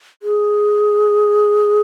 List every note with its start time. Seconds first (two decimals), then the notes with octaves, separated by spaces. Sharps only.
0.23 G#4